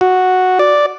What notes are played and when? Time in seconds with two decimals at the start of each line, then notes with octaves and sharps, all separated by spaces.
0.01 F#4
0.59 D5